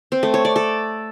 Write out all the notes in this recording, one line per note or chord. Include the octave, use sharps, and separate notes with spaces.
C4
A3
C#5
D5
A4